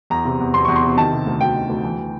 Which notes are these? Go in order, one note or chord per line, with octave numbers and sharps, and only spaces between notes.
E2 A#5
C3
E2
E2 C6
E2 C#6
C6
C3
D#3 A5
C3
D2
D2 G5
D#3
D2
E3
E3